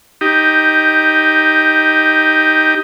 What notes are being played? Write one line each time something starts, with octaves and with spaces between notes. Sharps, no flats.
D#4 G4